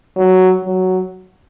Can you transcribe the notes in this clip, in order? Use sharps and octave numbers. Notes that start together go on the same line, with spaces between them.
F#3
F#3